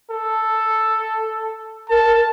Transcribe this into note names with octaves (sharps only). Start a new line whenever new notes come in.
A4
A#4 A5